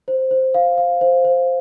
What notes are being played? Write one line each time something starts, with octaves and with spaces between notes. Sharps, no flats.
C5
C5
F5
F5
C5
C5